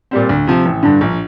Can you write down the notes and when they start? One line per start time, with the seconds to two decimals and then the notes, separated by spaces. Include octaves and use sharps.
0.11 A#2 G3 C4
0.29 D2
0.47 C3 F3
0.65 A1
0.83 G2 D3
1.01 A#1